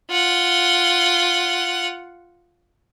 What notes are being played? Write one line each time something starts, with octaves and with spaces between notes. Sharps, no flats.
F4 F#5